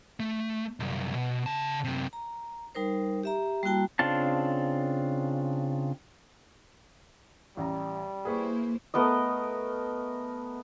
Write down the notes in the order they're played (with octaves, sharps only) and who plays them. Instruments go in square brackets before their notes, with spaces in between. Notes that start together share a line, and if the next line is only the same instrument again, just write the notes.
[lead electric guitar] A3
C2 F#2
B2
C#3 A5
F#2 C3
[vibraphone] A#5
G3 D#4 A#4 C5
G4 E5 A#5
G3 A#3 E4 F#4 G5 A5
[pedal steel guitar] C#3 C4 D4 F4 A5
[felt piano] A1 A#5 [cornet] G3
[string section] A#3 E4 C5 [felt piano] G#4 B4 C#6
[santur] A3 B3 A#4 D#5